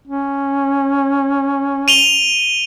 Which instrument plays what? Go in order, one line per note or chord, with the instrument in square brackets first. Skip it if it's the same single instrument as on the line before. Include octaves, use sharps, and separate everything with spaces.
[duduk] C#4
[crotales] D#7 F7 G7